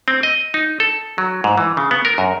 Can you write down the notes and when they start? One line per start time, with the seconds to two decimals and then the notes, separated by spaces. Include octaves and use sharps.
0.08 C4
0.23 D#5
0.54 D#4
0.80 A4
1.18 F#3
1.44 G#2
1.58 E3
1.77 C#3
1.91 B3
2.05 A#4
2.18 F#2